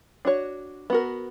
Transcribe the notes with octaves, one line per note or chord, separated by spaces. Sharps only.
D4 F#4 C#5
B3 F#4 A#4